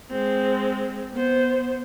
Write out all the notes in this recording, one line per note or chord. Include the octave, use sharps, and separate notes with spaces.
G#3 C4
B3 C5